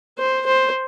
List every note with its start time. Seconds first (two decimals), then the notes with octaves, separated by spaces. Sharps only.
0.19 C5
0.46 C5